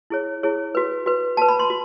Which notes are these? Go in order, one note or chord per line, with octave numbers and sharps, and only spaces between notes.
E4 G#4 C#5
E4 G#4 C#5
F#4 B4
F#4 B4
F#4 B4 A5
B5
C6
F#4